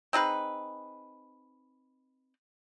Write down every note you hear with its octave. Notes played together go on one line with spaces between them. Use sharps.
C4 D#4 G#4 B4